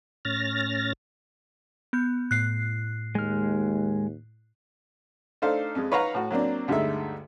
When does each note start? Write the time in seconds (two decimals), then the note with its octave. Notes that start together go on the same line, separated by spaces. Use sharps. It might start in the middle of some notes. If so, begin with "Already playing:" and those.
0.25 A2 C#4 F6 A6 A#6
1.93 B3 G6
2.31 A2 F#6 C7
3.15 D#2 G#3 F6
5.42 A3 D4 D#4 A4 C5 F5
5.75 F2 G#3
5.91 D#4 B4 C#5 F5 F#5 A#5
6.14 A2 F#4
6.30 F#3 A#3 C4 D4
6.68 D2 G2 G#3 A3 D#4 E5